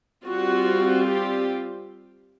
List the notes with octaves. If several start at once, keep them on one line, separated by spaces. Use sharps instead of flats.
G3 C4 F4 F#4
G4